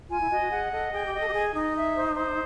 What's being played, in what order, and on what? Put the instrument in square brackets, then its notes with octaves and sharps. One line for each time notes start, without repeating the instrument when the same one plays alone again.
[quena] F4 [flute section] G#5
[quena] E4
[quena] F#4 [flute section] D#5
[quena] F#4
[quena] G#4 [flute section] F#5
[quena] A4 [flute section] D#5
[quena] G#4 [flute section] G5
[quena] G4
[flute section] D#5
[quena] A4
G4
[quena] G#4 [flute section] G#5
[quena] D#4 [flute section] D#5
[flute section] E5
C5
C5